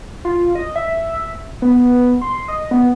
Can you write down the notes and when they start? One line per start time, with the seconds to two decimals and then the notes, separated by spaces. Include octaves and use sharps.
0.25 F4
0.55 D#5
0.76 E5
1.62 B3
2.21 C6
2.48 D#5
2.71 B3